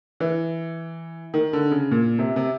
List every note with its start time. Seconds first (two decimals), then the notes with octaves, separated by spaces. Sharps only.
0.20 E3
1.34 D#3
1.53 D3
1.71 C#3
1.91 A#2
2.19 C3
2.36 C3